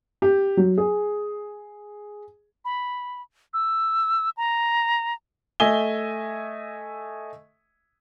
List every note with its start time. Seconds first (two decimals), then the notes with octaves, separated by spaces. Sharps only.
0.22 G4
0.57 F#3
0.78 G#4
2.65 B5
3.54 E6
4.37 A#5
5.60 A3 D#5 E5 G#5 G7